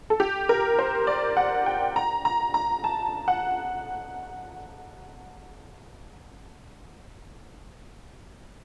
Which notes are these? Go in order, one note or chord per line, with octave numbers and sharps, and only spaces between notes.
A4
G4
A#4
C5
D5
F#5
G5
A#5
A#5
A#5
A5
F#5